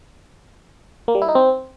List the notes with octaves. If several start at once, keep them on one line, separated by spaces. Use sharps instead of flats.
A#3
G3
E4
D#4
C4